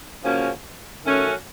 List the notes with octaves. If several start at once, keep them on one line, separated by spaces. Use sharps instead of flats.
C#3 F3 A#3 C#4 F#4
D#3 A3 C#4 F#4